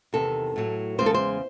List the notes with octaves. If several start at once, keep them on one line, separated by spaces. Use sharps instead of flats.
E2 C3 D#3 A4
A2 F#3 A3
E2 C#3 G#3 C5
A4
C5